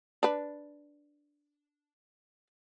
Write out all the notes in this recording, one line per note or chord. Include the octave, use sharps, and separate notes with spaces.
D4 B4